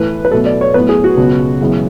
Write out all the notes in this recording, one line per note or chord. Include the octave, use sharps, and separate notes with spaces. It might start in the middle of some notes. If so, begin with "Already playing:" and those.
Already playing: A2 E3 A3 B4
B4
B2 F#3 A3 A4
D5
C#5
A2 F#3 B3 B4
G#4
F#4
C#2 B2 F#3 B3
F#2 C#3 E3 G#3 B3